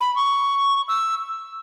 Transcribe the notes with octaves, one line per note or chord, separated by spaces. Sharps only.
B5
C#6
E6